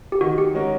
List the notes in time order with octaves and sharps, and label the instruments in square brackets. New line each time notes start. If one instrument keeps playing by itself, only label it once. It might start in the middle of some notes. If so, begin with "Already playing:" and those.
[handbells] G4
[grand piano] D#3 [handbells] F#4
[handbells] G4
[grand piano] G#3 C#4 F#4 A#4